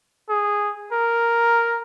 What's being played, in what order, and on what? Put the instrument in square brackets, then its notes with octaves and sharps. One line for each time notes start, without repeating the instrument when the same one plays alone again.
[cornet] G#4
A#4